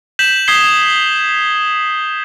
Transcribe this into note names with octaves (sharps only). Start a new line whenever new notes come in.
G6 B6 E7 F#7
D#6 G#6 B6 C7 G7